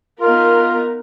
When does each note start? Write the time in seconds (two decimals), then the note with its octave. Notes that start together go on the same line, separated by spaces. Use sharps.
0.21 B3 D#4 F4 A#4